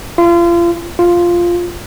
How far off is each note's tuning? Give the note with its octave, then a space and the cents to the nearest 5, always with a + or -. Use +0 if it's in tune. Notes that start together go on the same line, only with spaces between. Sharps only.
F4 -35
F4 -5